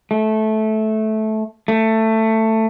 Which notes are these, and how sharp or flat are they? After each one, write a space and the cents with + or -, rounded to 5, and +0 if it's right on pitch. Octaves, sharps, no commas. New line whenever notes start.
A3 -15
A3 +15